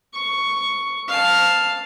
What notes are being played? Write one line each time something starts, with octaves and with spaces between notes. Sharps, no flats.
C#6
F5 A5